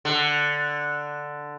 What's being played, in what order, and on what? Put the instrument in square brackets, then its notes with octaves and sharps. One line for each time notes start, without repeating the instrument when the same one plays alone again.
[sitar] D3